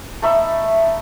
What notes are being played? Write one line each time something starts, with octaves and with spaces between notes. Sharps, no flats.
A3 D#4 E5 B5